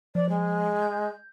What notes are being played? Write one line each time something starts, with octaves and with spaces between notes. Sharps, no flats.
F3 D5
G#3
G6